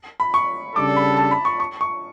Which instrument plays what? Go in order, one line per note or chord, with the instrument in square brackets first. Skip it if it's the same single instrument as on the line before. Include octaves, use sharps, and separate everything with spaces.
[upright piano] B5
C#6
[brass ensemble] C#3 G3 D4 A4 [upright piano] D6
[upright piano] B5
A5
B5
C#6
C#6
C#6